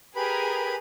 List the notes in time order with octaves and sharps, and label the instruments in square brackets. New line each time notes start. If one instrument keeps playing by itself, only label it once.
[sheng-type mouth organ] G4 B4 B5 [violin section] G#4 A#4